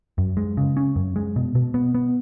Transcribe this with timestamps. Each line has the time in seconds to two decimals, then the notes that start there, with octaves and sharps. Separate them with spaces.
0.18 F#2
0.37 G#3
0.57 C#3
0.77 C#4
0.96 F#2
1.16 G#3
1.36 B2
1.55 B2
1.74 B3
1.94 B3